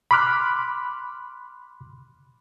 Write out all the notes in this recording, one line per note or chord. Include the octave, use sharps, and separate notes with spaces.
B5 C6 D6 F6 F#6